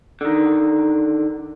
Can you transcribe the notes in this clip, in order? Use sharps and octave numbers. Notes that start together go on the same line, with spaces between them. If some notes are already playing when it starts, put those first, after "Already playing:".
D3 D#3